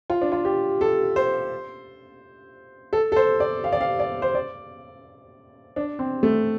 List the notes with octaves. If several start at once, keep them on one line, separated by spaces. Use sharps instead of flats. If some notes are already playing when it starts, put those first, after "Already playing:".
F4
D4
F4
G4
A4
C5
A4
A4
C5
D5
F5
D5
F5
D5
C5
D5
D4
C4
A3